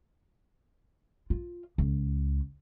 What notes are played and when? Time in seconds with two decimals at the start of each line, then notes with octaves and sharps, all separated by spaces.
1.30 F4
1.78 C#2